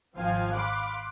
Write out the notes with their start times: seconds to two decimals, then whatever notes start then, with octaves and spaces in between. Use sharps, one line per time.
0.15 G#1 F3 C4 C5 F5 G#5
0.53 F5 B5 C6 D6 F#6